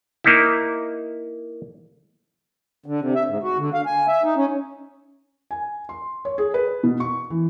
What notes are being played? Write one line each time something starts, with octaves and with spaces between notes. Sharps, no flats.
A#3 D#4 E4
D3
C3
E5
G#2
F#4
D3
F5
G#5
E5
D#4
C#4
G#5
C6
C#5
G#4
B4
B2
C#6
E3